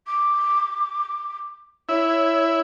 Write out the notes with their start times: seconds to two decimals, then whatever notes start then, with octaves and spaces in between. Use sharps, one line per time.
0.06 D6
1.89 E4 C#5